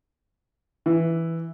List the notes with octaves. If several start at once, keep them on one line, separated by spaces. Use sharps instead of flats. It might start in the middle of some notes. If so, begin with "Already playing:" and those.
E3